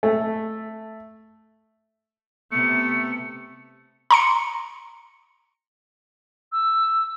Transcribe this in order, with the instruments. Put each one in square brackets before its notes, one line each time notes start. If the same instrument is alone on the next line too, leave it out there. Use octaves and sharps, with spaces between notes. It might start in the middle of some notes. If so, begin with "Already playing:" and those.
[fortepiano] A3
[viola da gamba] C3 B3 [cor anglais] A3 [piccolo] C#7
[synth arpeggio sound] A#5 C6 C#7
[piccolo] E6